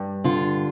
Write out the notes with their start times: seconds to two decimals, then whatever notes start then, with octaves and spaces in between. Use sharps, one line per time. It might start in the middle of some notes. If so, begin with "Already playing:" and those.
Already playing: G2
0.24 D3 F4